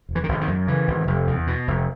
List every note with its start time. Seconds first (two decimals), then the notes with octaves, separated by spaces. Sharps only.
0.09 E1
0.15 E3
0.24 D#3
0.29 G#1 D3
0.41 D#3
0.48 F#2
0.68 C#3 E3
0.88 G#1
1.07 F1
1.27 E2
1.47 B2
1.68 F1